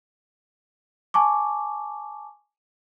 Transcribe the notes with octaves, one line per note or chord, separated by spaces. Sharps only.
G#5 A5 C#6 D6